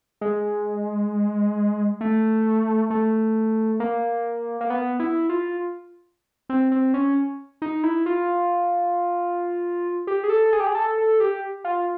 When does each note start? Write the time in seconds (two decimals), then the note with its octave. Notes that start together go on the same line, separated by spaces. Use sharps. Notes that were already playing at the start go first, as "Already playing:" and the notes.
0.21 G#3
2.01 A3
2.90 A3
3.80 A#3
4.61 A#3
4.70 B3
5.00 E4
5.29 F4
6.49 C4
6.72 C4
6.94 C#4
7.62 D#4
7.83 E4
8.06 F4
10.07 G4
10.24 G#4
10.30 A4
10.53 G#4
10.60 G4
10.67 G#4
10.75 A4
10.98 A4
11.20 G4
11.64 F4